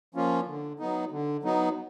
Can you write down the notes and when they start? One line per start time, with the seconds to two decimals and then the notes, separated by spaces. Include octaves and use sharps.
0.15 F3 A#3 C#4 F4
0.47 D3
0.79 F#3 B3 D#4
1.11 D3
1.43 F#3 B3 D#4